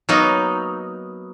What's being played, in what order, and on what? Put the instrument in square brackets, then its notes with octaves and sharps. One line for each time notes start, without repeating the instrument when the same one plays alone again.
[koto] F#3 A#3 B3 D#4 F#4